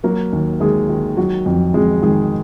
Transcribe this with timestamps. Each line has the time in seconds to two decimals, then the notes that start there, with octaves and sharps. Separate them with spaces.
0.04 F#3 A#3 A#4
0.32 D#2
0.60 D#2 G#3 G#4
0.89 D#3
1.17 F#3 F#4
1.46 F2
1.74 F2 G#3 G#4
2.02 D#3 G#3 G#4